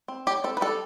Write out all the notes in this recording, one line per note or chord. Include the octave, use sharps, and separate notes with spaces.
C4
F#3 G4
C4 A4
B4
G3 A4